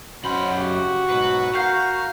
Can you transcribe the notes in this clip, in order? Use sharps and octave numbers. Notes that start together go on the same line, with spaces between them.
F#2 C#4 F#4 C5 B5
C#3 F#4 G4
G#2 B2 F#3 B4
A#4 F5 F#5 G6 C7